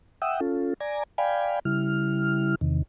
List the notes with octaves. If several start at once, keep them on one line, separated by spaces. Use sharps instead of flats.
E5 F#5 G5 D#6 E6
C#4 F4 A4
D5 G#5 A#5
D5 F5 G5 G#5 B5
C#3 G3 E4 F6
E2 C3 D#3